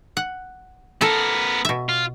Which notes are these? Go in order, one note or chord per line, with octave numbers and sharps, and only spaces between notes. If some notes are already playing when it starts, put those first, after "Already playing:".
F#5
B3 A4 A#4 A5
B2 E5
F4